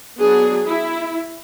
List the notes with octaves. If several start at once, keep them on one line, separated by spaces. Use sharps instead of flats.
F#3 B3 D4 G#4
E4